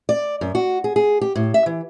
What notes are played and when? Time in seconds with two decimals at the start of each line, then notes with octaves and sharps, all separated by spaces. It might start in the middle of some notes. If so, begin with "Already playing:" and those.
0.09 D5
0.41 F#2
0.55 F#4
0.84 G#4
0.96 G#4
1.21 G4
1.35 A2
1.54 E5
1.66 E3